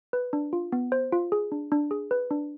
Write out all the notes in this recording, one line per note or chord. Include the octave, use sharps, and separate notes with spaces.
B4
D4
F4
B3
C5
F4
G#4
D4
D4
G#4
B4
D4